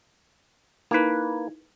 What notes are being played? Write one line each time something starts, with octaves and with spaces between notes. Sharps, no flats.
A#3 D#4 E4 B4 G#6